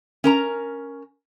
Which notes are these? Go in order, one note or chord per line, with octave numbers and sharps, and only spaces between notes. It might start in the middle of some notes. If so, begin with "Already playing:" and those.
C#4 A#4 A#5